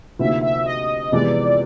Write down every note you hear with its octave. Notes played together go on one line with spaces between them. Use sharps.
D2 C3 F3 A#3 D#4 E5
E5
D#5
F2 C3 E3 G#3 B3 D5